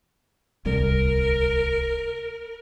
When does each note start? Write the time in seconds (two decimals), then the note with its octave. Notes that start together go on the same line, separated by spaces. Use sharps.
0.65 D1 C2 G3 A#4